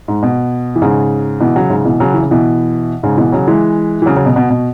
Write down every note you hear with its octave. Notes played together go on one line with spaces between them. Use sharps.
G#2
B2
E3
G#2 C#3
B2 E3
C#3 F#3
G#2 C#3
B2 E3
C#3 F#3
E3
C#3
B2 E3
G#2 C#3
B2 E3
C#3 F#3
E3 G#3
E3
C#3 F#3
C#3 F#3
B2
B2
B2